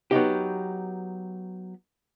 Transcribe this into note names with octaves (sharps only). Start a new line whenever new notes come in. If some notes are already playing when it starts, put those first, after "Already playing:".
F#3 B3 D#4 G4